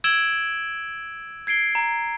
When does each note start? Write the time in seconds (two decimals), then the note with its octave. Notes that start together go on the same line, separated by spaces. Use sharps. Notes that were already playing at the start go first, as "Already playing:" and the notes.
0.04 E6 G#6 D7 E7 F#7 G7
1.47 G#6 C7 D7 G7
1.75 A#5